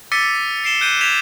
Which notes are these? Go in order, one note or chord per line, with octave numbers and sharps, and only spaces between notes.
D6 E6 A6 B6 C#7 D#7
A6 C7 D7 E7 G7
F#6 G6 D7 D#7 G7
G6 G#6 B6 D7 E7 F7